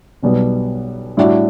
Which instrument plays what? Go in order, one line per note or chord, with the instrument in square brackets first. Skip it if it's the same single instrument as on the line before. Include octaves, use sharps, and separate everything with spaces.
[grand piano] B1 B2 G3 B3
A2 G3 D4 F#4